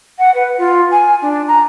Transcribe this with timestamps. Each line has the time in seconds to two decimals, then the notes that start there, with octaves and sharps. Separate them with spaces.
0.19 F#5
0.34 B4
0.58 F4
0.91 G#5
1.22 D4
1.48 A#5